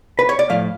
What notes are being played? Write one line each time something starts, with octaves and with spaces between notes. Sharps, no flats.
B4
C#5
D5
A2 F3 A3 F5